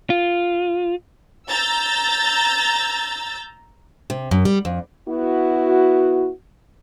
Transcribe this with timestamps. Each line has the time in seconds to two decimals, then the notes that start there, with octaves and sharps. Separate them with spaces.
0.10 F4
1.49 A#5 E6 G6 A6
4.10 C3
4.31 F#2
4.45 G3
4.65 F2
5.08 B3 E4 F#4